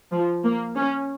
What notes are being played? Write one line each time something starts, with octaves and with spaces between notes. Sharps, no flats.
F3
A#3
C#4